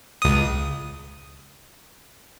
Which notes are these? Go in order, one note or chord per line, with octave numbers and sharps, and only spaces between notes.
C#2 D#6